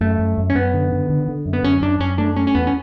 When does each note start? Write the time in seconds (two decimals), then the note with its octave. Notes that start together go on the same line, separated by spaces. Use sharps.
0.01 F#2 A3
0.19 F#2
0.38 F#2
0.50 C#4
0.55 F#2 B3
0.74 D3
0.92 D3
1.10 D3
1.28 D3
1.45 F#2
1.53 B3
1.63 F#2 C#4
1.82 F#2 D4
2.00 F#2 C#4
2.18 A3 D4
2.36 A3 C#4
2.47 C#4
2.55 E2 B3
2.67 C#4